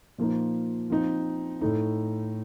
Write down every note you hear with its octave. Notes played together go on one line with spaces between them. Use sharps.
A#2 F3 A#3 D#4
F3 C4 D#4
A2 A3 D#4